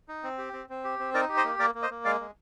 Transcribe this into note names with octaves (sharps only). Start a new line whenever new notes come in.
D#4
C4
G4
C4
C4
G4
C4
D#4 A#4 D5
G4
C5 D#5
A#3
A#3 A#4 D5
A#3
C5 D#5
A#3
G#3 D5 F5
G#3